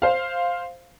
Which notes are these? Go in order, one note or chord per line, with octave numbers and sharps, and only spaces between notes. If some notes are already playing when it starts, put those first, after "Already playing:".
C5 F5